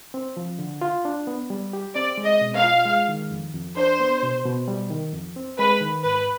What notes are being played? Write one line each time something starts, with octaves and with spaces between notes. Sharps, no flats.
C4
F3
D3
F4
D4
B3
G3
G4
C4 D5
G#3
D#5
B2
F5
F4
G#3
D#3
F2
F2
D4 C5
B3
B2
B2
G3
D#3
F2
C4
G#3 B4
D#3
G#2 B4